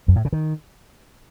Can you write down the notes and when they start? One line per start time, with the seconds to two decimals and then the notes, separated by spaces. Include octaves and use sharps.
0.08 F#2
0.16 A2
0.25 C#3
0.33 D#3